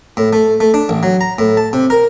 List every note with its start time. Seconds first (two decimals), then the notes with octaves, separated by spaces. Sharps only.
0.17 A2
0.33 A3
0.60 A3
0.74 D4
0.89 A1
1.03 F#3
1.21 A#5
1.39 A2
1.57 A5
1.73 C3
1.90 A#4